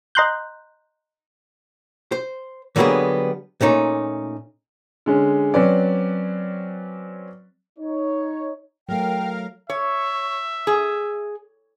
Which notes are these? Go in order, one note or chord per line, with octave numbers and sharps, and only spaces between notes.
D#5 A#5 C6 F#6 G6
C5
D3 F#3 G3 A#3 B3 G#4
A#2 A3 C#4 D#4
D3 G#3 C#4
F#3 C4 C#4 B4 D5
D#4 C#5
F#3 A3 A#4 F5 G5 F6
C#5 E5
G#4